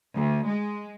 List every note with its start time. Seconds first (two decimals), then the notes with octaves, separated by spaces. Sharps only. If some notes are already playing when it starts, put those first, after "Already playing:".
0.16 D2
0.46 G#3